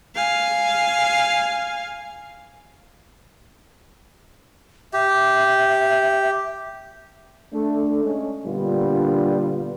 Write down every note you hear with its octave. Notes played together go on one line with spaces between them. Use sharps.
F5 G#5
G4 E5
A3 D4 A4
G#3 C#4
A#2 D3 G3 B3 D4 F4